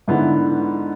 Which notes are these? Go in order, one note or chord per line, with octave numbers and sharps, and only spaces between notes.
G#2 D3 B3 E4